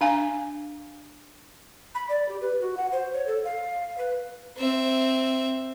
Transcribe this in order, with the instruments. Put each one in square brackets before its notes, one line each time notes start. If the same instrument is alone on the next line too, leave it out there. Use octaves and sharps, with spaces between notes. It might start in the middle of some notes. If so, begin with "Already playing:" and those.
[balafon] D4 F5 G#5
[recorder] B5
D5
G4
B4
F#4
F#5
C5
C#5
A4
F5
B4
[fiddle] C4 E5